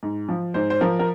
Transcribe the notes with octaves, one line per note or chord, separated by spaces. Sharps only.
G#2
F3
G#2 C5
C5
F3 A#4
A#4